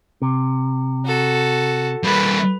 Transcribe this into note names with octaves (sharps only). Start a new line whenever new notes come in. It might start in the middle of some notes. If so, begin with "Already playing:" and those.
C3
F#4 A4
G3 A#3 B4